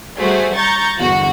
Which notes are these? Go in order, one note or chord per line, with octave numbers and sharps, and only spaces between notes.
G3 A3 F#4 G#4 C5
A#5 C#6 G6 A6
G1 E2 D3 F#4